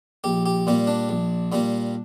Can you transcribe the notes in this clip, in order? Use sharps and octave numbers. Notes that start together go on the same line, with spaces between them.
A#1 G4
G4
A#2 G3 A#3
D4
A#1
A#2 G3 A#3